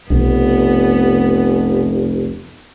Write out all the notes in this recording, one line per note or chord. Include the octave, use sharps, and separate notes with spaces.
F1 B1 B3